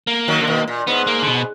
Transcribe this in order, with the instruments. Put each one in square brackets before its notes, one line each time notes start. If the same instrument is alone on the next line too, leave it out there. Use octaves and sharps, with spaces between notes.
[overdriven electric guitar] A#3
[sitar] D#3 F#3
D3
B2 D#3
A#2
[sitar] G#2 [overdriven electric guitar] B3
[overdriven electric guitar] A#3
D3
B2